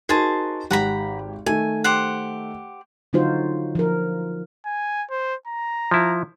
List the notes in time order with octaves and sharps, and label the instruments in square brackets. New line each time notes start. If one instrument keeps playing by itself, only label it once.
[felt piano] D#4 F#4 A#4 [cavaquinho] G#4 C5 A5
[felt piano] G#1 G4 [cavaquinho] F#5 A#5 B5
[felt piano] D#3 A3 [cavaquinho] G#5
[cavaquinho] G4 C5 F#5
[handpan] D3 F#3 D#4 F4 F#4 C5
F3 A#4
[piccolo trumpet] G#5
C5
A#5
[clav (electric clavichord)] F3 E4